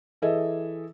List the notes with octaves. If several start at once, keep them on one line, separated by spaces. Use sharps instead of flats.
E3 G#4 A4 D#5 E5